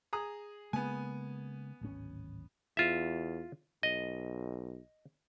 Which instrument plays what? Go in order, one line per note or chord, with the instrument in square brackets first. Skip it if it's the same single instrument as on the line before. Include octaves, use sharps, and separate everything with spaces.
[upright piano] G#4 A#5 D#6
[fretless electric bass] C#3 G#3 A#3 [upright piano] B3 G#5
[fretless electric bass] D1 G#1 C#4
[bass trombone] E2 [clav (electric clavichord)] F4 E5
[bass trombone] B1 [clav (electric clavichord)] D#5